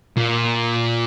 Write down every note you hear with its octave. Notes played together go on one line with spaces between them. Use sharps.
A#2